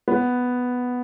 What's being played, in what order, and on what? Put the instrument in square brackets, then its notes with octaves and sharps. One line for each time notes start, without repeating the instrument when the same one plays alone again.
[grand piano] B3